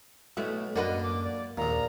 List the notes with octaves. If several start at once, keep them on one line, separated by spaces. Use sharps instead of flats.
B1 A3 E4 F#4
F#2 A#3 D4 F#4 B4 D#5
D6
D5
A#1 D#2 A#2 A#5